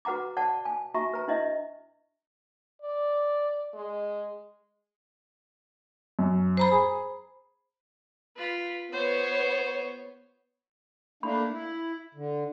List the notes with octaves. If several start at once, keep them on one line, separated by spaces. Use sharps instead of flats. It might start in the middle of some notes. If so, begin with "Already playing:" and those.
F#4 B4 F#5 A#5 D6
D5 F#5 A5
G#5
F#4 E5 A#5 C#6
B4 A#5
D4 E4 D#5 E5
D5
G#3
F#2
C5 A#5 B5
G#4
F4 B4
B3 C5 C#5
A3 A#3 D4 B5
E4
D3